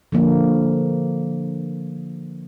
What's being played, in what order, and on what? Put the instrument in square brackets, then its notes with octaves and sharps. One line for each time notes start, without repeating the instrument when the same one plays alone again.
[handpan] D3 F3 A#3